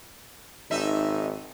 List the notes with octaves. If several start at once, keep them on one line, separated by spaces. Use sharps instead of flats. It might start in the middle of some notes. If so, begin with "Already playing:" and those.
G#1 D#4 E5